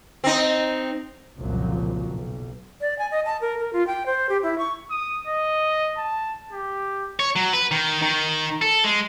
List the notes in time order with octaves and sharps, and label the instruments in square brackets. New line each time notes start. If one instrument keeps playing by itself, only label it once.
[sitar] C4 D#4
[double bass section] F#1 C2 F#2 A#2 F3 F#3
B1
[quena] D5
G#5
D#5
A5
A#4
A#4
F4
G5
C5
G4
E4
C#6
[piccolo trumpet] D#6
D#5
A5
G4
[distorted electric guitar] C#5
F#3
B4
D#3
D#3
A4
G#3